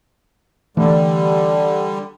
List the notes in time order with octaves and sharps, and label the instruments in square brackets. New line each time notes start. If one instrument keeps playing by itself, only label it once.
[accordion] D3 G3 [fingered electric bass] E3 A3